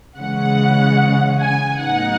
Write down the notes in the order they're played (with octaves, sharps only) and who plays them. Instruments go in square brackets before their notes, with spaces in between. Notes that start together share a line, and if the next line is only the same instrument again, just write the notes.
[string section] C#3 E3 G#3 C#4 F#5
G#5
A2 F#3 B3 D#4 F#5